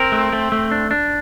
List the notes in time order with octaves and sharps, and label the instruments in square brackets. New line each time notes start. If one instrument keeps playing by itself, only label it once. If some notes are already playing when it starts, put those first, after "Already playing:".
Already playing: [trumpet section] C4 [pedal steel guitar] A#4
[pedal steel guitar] A3
A3
A3
D4
D4